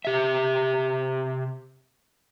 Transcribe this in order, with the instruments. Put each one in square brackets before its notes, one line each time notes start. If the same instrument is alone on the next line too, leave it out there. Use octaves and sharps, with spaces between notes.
[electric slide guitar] C3 G4 E5